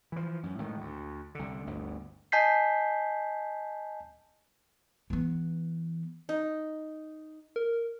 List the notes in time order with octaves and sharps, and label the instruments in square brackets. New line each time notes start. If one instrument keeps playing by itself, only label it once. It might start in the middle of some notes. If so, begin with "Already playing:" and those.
[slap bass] E3 F3
F#2
A2 D#3 G#3
D2
C2 D3
G1 D2
[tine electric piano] D#5 G#5 A5 G6 B6 C7
[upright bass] E3 B3
[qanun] D#4
[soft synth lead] A#4